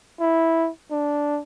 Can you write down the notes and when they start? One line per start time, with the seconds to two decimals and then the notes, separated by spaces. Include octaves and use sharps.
0.20 E4
0.91 D4